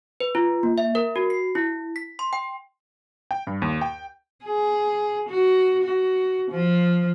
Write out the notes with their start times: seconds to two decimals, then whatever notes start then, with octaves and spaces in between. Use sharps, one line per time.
0.20 B4
0.35 F4
0.63 A#3
0.78 E5
0.95 A#4
1.16 F#4
1.30 C7
1.55 E4
1.96 B6
2.19 C6
2.33 G5
3.31 G5
3.47 G2
3.62 D#2
3.81 G5
4.45 G#4
5.29 F#4
5.83 F#4
6.51 F3